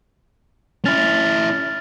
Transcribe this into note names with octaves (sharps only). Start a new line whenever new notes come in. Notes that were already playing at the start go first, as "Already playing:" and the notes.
C#4 E4 F6 A6 F7